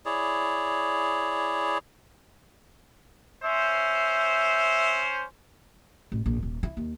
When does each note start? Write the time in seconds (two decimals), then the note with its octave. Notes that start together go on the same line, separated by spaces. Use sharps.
0.05 E4 G#4 C#5 D5
3.44 C#4 C5 E5
6.12 A1
6.26 A#1
6.43 D#1
6.63 E4
6.77 D#2